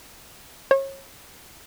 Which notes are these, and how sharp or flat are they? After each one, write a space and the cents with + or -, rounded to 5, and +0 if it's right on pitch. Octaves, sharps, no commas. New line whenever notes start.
C#5 -30